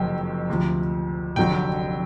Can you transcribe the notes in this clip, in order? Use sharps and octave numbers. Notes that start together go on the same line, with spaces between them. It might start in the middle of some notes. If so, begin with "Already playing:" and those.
Already playing: F#1 F2 C3 D#3 F#3 G5
D2 C3 F3
F1 F2 D3 F#3 G5